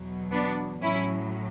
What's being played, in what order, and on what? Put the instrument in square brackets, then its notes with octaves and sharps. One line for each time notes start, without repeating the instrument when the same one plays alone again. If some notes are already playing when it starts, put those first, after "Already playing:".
Already playing: [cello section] E2 B2 F#3
B3 D4
A2 F#3 C#4 E4